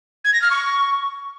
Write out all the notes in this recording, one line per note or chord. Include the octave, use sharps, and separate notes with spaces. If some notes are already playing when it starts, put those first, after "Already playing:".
G#6
A#6
F6
C#6